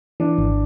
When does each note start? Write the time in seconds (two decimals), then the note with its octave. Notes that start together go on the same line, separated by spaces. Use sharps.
0.20 E3 D4
0.38 G#1